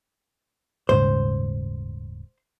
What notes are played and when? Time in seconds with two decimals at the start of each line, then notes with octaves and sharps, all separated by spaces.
0.89 D#1 G#2 C#3 C5